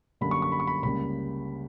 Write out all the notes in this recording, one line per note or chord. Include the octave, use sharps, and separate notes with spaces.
F#2 D3 G3 A#3 B5
C#6
C#6
B5
C#6
B5
C#2 C#3 G3 A#3 B5